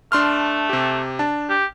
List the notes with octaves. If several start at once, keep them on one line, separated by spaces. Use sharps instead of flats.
A3 D4 C6 F6
C3 G4
D4 A5
G4